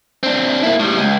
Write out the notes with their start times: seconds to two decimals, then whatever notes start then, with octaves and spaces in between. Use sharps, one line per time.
0.23 C4 D4
0.63 A#3 E4
0.80 A2 G3
0.98 C#2